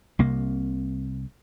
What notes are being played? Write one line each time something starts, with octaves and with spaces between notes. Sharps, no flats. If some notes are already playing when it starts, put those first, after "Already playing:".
C2 C3 A#3